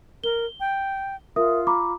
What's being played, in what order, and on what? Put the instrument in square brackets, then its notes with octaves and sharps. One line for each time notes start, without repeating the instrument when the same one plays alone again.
[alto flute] A#4 [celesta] G7
[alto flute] G5
[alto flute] F4 [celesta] A#4 E5 D#6
[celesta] A#5 B5 D6